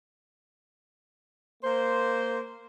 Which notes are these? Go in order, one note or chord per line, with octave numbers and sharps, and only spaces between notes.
A#3 C5